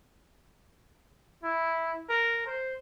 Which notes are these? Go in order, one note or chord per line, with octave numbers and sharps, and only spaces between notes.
E4
A#4
C5